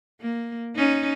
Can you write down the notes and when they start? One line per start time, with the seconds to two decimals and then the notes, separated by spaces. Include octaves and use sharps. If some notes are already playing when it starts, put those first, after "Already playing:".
0.21 A#3
0.76 C#4 D#4